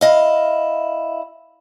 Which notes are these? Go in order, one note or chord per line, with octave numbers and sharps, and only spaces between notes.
E4 D#5 F5